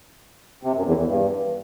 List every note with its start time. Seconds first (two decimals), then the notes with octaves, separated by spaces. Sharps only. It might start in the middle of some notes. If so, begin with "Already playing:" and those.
0.63 C3
0.74 F#2
0.84 E2
0.95 E2
1.06 G2